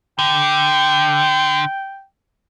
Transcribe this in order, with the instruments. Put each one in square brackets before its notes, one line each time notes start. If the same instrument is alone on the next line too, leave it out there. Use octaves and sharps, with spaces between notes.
[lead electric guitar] D3 [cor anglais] G5